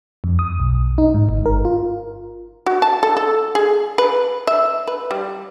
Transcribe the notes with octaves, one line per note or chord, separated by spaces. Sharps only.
F2
D#6
B1
D#4
G#2
G1
A#4
F4
F#4
A5
A4
A4
G#4
B4
E5
B4
G3